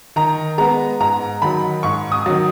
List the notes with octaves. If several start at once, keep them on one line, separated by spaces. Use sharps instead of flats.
D#3 A#5
G#3 B3 A#5
G#2 A#5
D#3 F#3 B5
G#2 C#6
D#6
D#3 F#3